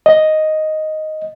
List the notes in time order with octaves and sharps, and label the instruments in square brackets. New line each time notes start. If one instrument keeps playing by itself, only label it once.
[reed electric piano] D#5